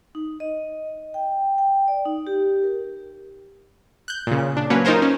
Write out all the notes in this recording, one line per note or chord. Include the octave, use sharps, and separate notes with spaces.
D#4
D#5
G5
G5
D5
D#4
G4
A#4
F#6 G6
A#2 C#3
D4
F#3 A#3 C#4 B4 C#5
D#4 F4 A#4 C5 C#5
C#4